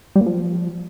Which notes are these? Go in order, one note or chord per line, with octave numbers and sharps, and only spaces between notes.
G3
A#2
F3